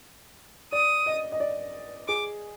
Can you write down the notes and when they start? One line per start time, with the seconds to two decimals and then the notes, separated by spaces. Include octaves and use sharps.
0.72 D5 D#6
1.06 D#5
1.32 D#5
1.40 D5
2.08 G#4 D6